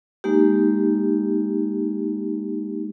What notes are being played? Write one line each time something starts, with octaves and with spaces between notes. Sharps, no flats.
G#3 A#3 D#4 G4